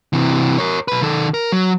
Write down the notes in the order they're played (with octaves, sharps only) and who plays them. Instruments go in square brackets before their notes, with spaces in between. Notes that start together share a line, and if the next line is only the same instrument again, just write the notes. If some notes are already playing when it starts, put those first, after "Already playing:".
[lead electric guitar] C3 E3
A#4 C#5
B1 B4
D#3 A4
A#4
F#3